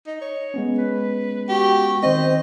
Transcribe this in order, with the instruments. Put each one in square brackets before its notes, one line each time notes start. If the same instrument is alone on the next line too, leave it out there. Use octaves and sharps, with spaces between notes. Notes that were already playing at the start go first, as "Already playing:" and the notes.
[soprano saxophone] D#4
C#5
[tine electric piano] G#3 B3 C#4
[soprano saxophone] B4
[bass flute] F#4 [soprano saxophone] G4
[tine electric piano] D#3 C4 [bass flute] C5 [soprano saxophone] D#5